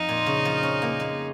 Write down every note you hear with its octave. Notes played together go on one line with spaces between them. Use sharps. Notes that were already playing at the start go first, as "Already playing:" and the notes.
Already playing: F2 D#4
A#2
C#3
F3
C#4
A#3
G#3